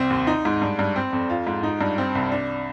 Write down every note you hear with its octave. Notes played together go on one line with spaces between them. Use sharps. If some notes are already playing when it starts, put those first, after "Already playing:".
Already playing: C2 C4
D#2
D#4
G#2
G2
G2
C4
F2
F4
G#2
D#4
G2
C4
C2
D4